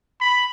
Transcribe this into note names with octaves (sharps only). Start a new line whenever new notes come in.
B5